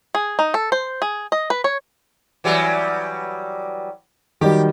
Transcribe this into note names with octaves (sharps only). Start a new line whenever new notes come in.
G#4
D#4
A4
C5
G#4
D#5
B4
C#5
E3 F#3 G3
D#3 F#3 G3 G4